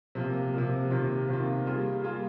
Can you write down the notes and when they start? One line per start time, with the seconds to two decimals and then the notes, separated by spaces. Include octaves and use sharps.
0.15 C3 F3 A#3
0.53 C3 F3 A#3
0.90 C3 D#3 A#3 F4
1.29 C3 D#3 A#3 F4
1.66 G3 A#3 F4 G#4
2.04 G3 A#3 F4 G#4